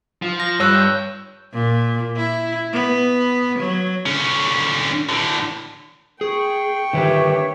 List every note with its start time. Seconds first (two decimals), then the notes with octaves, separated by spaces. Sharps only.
0.22 F3
0.40 A#6
0.60 G2 C#5 E6 F#6
0.75 G6
1.53 A#2
2.16 E4
2.73 B3
3.59 F#3
4.06 D3 C#4
5.09 A2 D3
6.21 G#4 G5 C#6
6.93 D3 D#3 G4 B4 C#5 E5